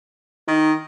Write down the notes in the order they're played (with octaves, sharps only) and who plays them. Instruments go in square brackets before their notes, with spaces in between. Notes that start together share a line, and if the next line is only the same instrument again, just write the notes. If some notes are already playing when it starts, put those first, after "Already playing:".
[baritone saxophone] D#3 [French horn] D#4